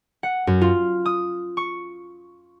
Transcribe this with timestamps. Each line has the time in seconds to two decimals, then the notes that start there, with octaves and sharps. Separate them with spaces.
0.23 F#5
0.47 F#2
0.61 F4
1.06 D#6
1.57 C#6